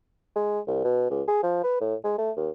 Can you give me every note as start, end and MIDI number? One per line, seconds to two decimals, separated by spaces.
0.36 0.60 56
0.67 0.84 36
0.84 1.08 47
1.10 1.22 37
1.28 1.40 68
1.43 1.60 53
1.64 1.80 71
1.81 1.95 45
2.04 2.18 56
2.18 2.31 57
2.37 2.50 39